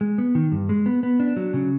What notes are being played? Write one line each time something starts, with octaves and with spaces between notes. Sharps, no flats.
G#3
B3
D#3
G2
G#3
B3
B3
D4
F#3
C#3